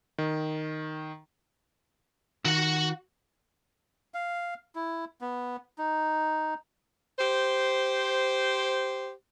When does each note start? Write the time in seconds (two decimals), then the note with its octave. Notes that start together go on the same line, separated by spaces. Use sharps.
0.18 D#3
2.45 D#3 F#4 F#5
4.14 F5
4.75 E4
5.21 B3
5.78 D#4
7.19 G4 C5